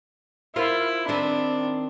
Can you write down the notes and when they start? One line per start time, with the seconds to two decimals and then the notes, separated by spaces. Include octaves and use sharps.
0.56 E4 F4 A#4 C5
1.08 D#3 C4 D4 B4